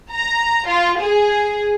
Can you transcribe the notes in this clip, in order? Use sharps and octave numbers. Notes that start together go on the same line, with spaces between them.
A#5
F4
G#4